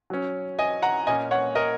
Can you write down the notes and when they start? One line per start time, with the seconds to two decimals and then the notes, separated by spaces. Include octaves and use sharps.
0.10 F#3 C#4
0.59 D#5 G#5
0.82 F#5 A#5
1.07 A#2 A#3 C#4 D#5 G#5
1.31 C#5 F#5
1.55 A#4 D#5